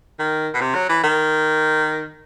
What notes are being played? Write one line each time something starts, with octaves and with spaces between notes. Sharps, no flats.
D#3
B2
C3
F#3
E3
D#3